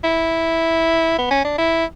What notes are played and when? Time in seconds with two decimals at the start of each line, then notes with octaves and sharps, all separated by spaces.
0.04 E4
1.18 B3
1.31 C#4
1.44 D4
1.58 E4